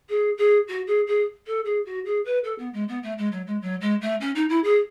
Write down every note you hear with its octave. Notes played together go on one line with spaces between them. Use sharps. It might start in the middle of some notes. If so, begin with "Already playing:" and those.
G#4
G#4
F#4
G#4
G#4
A4
G#4
F#4
G#4
B4
A4
B3
G#3
B3
A3
G#3
F#3
G#3
F#3
G#3
A3
C#4
D#4
E4
G#4